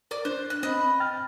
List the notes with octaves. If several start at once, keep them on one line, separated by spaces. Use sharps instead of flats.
A#4 D5 D6
D4 C5 F#6
F#6
C4 D#5 B5
G5 F6 A6